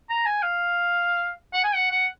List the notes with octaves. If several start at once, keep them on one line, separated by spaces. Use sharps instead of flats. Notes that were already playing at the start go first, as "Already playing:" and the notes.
A#5
G#5
F5
F#5
G#5
F#5
F#5